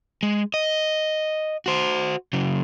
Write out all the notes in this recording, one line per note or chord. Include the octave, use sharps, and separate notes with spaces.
G#3
D#5
F#4 C5
C#3 F#3